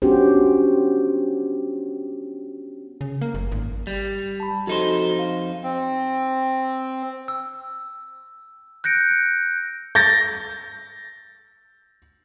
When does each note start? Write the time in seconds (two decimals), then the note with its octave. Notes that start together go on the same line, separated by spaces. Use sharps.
0.02 B3 C#4 D4 F#4 G4 C5
3.01 C#3
3.21 A#3
3.34 F#1
3.52 G#1
3.87 G3
4.40 A5 B5
4.67 F2 D#4 F#4 A4 C5
5.19 F5
5.63 C4
7.28 E6
8.84 F#6 G6 A#6 C#7 D7
9.95 G6 A6 A#6